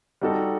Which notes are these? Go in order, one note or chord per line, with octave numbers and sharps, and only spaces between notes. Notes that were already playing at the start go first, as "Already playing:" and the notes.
G3 D#4 F#4 A4